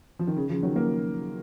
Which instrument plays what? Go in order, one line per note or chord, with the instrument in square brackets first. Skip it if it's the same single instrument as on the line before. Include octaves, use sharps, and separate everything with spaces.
[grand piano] F3
D#3
C#3
C#3 F3
D#3 F#3
F#3 A#3